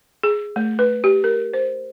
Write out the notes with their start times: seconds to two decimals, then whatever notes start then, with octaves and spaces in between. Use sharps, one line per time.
0.23 G#4
0.56 A3
0.79 B4
1.04 G4
1.24 A#4
1.53 C5